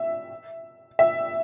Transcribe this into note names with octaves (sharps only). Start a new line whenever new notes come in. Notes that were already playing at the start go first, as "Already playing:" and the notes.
Already playing: E5
E5